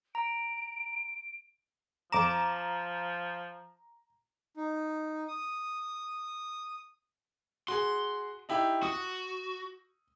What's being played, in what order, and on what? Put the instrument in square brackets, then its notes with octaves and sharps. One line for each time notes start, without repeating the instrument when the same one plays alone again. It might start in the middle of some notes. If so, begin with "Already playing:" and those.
[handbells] A#5 [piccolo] D7
[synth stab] F2 D6 E7 [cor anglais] F3 [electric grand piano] A#5
[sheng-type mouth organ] D#4
D#6
[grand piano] F#4 G#4 [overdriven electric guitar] C6
[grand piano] D#4 E4 G4
[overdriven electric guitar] F#4 [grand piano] D#6